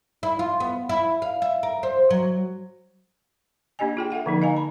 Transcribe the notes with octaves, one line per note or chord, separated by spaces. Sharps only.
E4
F4
B3
E4
F5
E5
A#4
C5
F#3
A#3 D4 G4 D#5 G#5
F4 G#4 G5
A4 E5 F#5 G5
D3 F3 A#3 D#4
D#5 F5 G#5 A#5
A5 B5